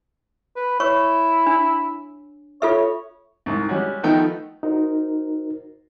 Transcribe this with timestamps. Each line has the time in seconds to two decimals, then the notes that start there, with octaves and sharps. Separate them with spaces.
0.56 B4
0.80 E4 C#5 C#6
1.47 D4
2.62 F4 A4 C#5 E5
3.46 C2 G#2
3.69 G3 G#3 C#4 F#4
4.03 D#3 F3 A3 B3 D#4 G5
4.63 D#4 F#4 A#4 C5